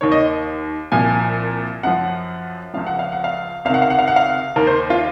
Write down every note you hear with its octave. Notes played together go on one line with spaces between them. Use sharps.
D#2 D#3 C#5
D#5
C2 A#2 F3 G#5
F#2 F3 F#5
C#2 C#3 F3 F5
F#5
F5
F#5
F5
C#2 C3 D#3 F5
F#5
F5
F#5
F5
F#5
F5
D#2 D#3 A#4
C5
F4